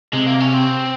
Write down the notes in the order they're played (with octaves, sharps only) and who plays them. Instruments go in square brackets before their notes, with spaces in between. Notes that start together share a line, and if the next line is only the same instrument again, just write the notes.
[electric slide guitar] C3 [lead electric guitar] G#3
[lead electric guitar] A#3
C#4
C4